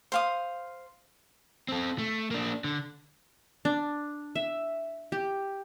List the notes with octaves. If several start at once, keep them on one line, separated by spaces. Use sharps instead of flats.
C5 F5 D#6
C4 A4
A3
A#3 D4
D3
D4
E5
G4